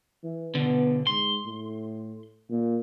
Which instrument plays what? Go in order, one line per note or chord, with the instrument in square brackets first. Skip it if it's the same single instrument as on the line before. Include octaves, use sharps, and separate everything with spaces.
[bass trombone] E3
[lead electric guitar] B2 D3 [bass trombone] B3
[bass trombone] G#2 [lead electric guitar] C6
[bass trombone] A2
A#2